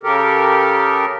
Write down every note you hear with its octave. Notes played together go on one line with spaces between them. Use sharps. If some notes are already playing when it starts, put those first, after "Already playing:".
C#3 G4 A4 A#4